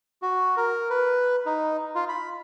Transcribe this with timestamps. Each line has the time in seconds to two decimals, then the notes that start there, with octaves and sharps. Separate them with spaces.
0.22 F#4
0.57 A#4
0.90 B4
1.46 D#4
1.95 F4
2.09 B5